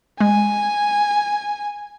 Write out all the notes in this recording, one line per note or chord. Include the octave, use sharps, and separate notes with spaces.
G#3 G#5